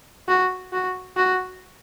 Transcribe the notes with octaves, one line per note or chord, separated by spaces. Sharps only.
F#4
F#4
F#4